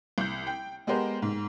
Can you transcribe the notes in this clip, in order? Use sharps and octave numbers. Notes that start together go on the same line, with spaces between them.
C2 G6
G5
G#3 B3 G4 A#4 C5
G#2